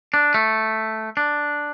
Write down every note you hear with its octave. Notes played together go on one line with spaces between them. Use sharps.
D4
A3
D4